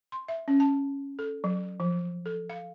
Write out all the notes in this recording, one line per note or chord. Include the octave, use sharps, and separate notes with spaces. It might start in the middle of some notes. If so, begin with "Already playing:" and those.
C6
E5
C#4
A5
A4
F#3
F3
A4
F5